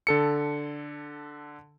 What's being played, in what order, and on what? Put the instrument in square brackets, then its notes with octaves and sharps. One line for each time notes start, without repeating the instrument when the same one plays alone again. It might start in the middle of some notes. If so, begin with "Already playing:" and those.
[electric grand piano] D3 A4 C#7